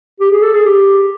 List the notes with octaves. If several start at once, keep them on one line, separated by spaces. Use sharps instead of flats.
G4
G#4
A4
G#4
G4